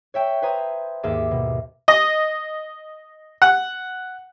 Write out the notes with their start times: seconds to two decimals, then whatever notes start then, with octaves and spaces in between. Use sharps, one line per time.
0.14 C#5 E5 G5
0.42 B4 C5 E5 G#5 A#5 D#6
1.03 D#2 G#2 A#3 G#4 E5 D6
1.31 B2
1.88 D#5
3.42 F#5